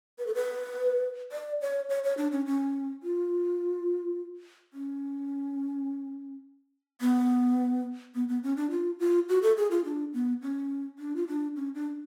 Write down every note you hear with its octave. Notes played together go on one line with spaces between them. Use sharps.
B4
A4
B4
D5
C#5
C#5
C#5
D4
C#4
C#4
F4
C#4
B3
B3
B3
C#4
D4
F4
F4
F#4
A4
G#4
F4
D4
B3
C#4
D4
F4
D4
C#4
D4